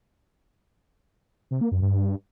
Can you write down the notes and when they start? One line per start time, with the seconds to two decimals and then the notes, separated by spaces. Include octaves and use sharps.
1.51 C3
1.61 A#3
1.72 F#2
1.82 G2